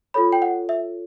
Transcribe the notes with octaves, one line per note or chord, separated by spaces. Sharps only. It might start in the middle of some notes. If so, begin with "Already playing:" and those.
F4 A4 C#5 B5
G5
F#5
E5